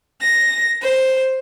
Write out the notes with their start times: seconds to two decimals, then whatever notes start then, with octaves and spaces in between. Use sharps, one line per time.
0.21 A#6
0.82 C5